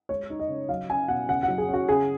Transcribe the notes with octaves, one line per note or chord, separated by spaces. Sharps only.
G#3 C#5
D#4
D#5
C#3
F#3 F5
C#4 G#5
B2 F#5
C#3 F#5
F#5
F#3
G#4
C#4
F#4
C#3 G#4